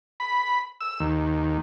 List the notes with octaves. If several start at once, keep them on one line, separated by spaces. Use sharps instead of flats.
B5
E6
D#2